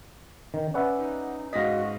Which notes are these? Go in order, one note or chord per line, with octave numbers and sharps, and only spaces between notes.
D#3
C#4 B4 D5 E5 F#5
D#4
G#2 F#4 D#5 F5 A#6 B6